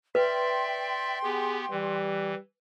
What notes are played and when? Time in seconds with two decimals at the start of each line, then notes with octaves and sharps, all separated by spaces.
0.15 B4 D5 E5 G5 C6
1.24 B3 G4 G#4
1.70 E3 G3